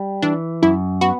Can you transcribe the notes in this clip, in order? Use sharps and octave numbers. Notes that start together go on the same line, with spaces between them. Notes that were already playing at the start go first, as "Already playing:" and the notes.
Already playing: G3
E3 D4
F#2 E4
B3 F#4